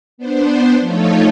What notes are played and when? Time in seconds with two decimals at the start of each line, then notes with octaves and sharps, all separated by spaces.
0.18 B3 D4 C5
0.80 F3 A3 D#4 F4 A4 C#5